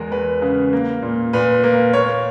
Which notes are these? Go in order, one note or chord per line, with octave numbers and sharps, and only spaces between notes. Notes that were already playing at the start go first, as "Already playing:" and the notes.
Already playing: E2 G#3 A#4
E2 B4
C#3
A#3
A#2
A#2 B4
A#3
A#3 C#5